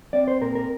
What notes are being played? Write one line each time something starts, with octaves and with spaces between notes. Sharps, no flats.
C4 D5
C5
A#2 A#4
A#4